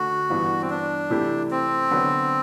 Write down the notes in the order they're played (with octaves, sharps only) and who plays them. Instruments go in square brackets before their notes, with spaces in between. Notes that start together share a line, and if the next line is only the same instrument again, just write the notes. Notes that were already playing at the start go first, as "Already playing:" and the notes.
Already playing: [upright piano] D3 A3 [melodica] F#4
[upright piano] G2 E3 B3
[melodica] C4
D4
[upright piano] C3 E3 A3 E4 G4
[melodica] C4
[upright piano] D3 F#3 B3